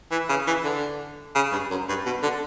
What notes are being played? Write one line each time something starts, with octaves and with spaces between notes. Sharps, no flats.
E3
C#3
E3
D3
C#3
G2
F#2
G2
B2
D3